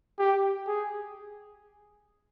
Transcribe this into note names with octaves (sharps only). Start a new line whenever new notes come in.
G4
G#4